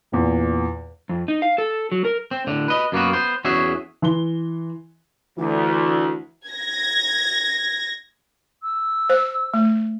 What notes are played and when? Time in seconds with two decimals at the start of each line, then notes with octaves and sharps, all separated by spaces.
0.12 E2 A#2
1.09 F2
1.28 D#4
1.42 F5
1.58 A4
1.92 F#3
2.05 A#4
2.31 C4
2.47 A2 D3
2.68 B4 D#5
2.92 F#2 A#3 B3 F#4
3.13 B3 C5
3.45 E2 C#4 F#4 G#4 E5
4.02 E3 C6 G7
5.38 D2 E3
6.49 G#6 A#6
8.63 E6
9.10 C5
9.54 A3